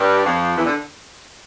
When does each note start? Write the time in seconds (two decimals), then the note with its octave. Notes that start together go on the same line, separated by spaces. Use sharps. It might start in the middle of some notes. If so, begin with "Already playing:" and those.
Already playing: G2 G3
0.25 F2 F3
0.57 E2 E3
0.65 D3